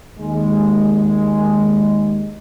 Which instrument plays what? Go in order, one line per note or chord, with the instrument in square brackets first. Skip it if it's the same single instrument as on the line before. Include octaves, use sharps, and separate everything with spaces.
[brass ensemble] D#2 G#3